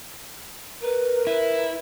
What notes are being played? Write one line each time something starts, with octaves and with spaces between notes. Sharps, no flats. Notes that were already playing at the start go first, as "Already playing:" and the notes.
A#4 B4
E4 B4